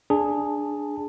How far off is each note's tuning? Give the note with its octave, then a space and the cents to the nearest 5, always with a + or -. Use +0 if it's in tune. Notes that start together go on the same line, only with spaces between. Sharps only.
D4 +0 G#4 +0 A5 +15